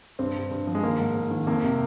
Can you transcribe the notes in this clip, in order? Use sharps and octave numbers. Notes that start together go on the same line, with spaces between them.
G2 C4
G2
G2
F3
G#3
D#3 A#3
G#2
G#2
D#3
F2 A#3
C3